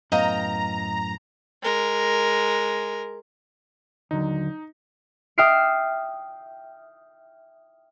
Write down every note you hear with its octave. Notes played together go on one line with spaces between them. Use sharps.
F#2 A2 B3 D#5 F5 G5 A#5
G#3 A#4
D#2 D3 F#3 D#4
E5 G5 D#6 F6 C7 D7